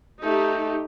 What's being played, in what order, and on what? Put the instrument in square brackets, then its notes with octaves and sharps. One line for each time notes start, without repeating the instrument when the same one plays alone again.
[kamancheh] A3 [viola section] D#4 G4